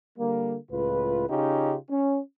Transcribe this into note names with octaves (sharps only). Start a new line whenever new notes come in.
D3 G3 A#3
C#2 A2 F4 B4
C#3 C#4 D#4 F4 G4
C#4